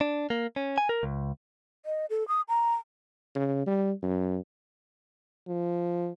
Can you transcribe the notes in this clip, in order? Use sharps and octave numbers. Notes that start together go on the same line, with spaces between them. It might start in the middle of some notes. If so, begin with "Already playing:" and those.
D4
A#3
C#4
G#5
A#4
C#2
D#5
A4
D#6
A#5
C#3
G3
F#2
F3